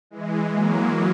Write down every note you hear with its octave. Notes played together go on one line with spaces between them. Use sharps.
E3 G#3
F#3 A#3